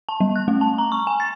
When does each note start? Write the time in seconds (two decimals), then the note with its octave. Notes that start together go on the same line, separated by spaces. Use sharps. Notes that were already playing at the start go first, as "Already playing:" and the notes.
0.09 A5
0.20 G3
0.36 F#6
0.48 A3
0.61 A5
0.78 A#5
0.92 C#6
1.07 G#5
1.20 A6